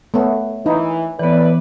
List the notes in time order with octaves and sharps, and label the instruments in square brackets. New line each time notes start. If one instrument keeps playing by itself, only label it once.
[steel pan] A3 B3 [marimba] C#5 E5
[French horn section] E3 [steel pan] D#4 [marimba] B5
[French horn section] A2 B4 D5 [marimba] E3 B3